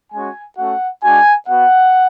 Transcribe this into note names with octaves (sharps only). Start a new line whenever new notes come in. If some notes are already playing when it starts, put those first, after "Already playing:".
G#3 C#4 F#4 G#5
A3 C#4 F#4 F#5
G#3 D4 F#4 G#5
B3 F#4 F#5